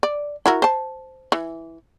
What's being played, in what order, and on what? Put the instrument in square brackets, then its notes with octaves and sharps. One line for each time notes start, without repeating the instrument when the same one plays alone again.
[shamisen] D5
E4 F#4 A#4
C5 A5
E3